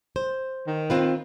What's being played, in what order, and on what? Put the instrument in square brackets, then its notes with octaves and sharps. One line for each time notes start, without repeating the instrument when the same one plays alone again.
[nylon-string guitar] C5
[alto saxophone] D#3
[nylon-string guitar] C4 F4 B4